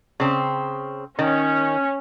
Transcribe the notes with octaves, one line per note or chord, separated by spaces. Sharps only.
C#3 C4
D#3 C#4